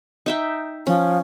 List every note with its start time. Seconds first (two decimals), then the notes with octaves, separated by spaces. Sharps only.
0.26 D#4 E5 G5
0.87 F3 C#4